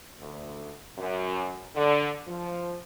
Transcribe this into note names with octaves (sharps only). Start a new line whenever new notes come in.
D2
F#2
D3
F3